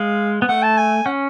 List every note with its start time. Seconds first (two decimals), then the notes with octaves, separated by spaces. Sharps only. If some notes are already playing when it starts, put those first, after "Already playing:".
Already playing: G#3 F5
0.42 B3
0.48 A3 F#5
0.63 A5
0.77 G#5
1.06 C#4 F#5